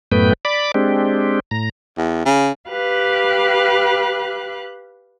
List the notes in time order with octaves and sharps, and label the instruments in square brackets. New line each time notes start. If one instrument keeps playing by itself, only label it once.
[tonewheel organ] F#2 A2 A3 B3 B4 G5
D5 B5 D6
G#3 C4 D4 G4
A2 A#5
[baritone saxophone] E2
C#3
[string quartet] G4 B4 F5 F#6